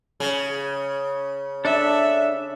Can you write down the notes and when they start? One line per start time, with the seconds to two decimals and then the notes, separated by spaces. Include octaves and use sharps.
0.20 C#3
1.65 D4 A4 E5